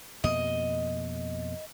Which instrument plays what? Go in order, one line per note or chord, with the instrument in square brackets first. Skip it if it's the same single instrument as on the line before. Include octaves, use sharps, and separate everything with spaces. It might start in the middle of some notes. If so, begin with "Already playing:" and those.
[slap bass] F2 B2 A#3 [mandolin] D#5